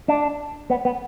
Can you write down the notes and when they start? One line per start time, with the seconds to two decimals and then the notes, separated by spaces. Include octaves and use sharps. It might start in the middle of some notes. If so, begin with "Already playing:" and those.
0.08 D4
0.70 B3
0.85 B3